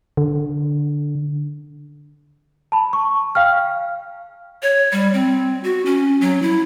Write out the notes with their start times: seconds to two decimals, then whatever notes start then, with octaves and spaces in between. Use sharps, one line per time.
0.17 D3
2.72 A5 B5
2.93 C#6
3.35 F5 G5 F6
4.62 C#5
4.92 G3
5.14 C4
5.64 F#4
5.86 C#4
6.21 F#3
6.42 E4